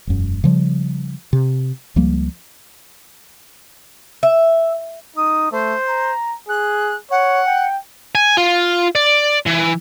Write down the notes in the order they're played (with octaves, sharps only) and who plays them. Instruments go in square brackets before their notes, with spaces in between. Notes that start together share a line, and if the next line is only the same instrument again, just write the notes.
[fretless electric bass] E1 F#2
C#3 F3 G3
C3
C#2 F3 G3 A#3
[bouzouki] E5
[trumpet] D#4 [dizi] D#6
[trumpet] A3 [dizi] C5
[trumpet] A#5
[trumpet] G#4 [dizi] F#6
[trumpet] C#5 [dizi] F#5
[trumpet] G5
[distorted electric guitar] G#5
F4
D5
E3